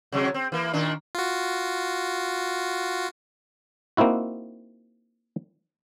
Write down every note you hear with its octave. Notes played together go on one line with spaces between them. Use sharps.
C3 F#3 G#3
C4
E3 A#3
A#2 D#3 D4
F4 F#4
A#3 C4 D#4 E4 F#4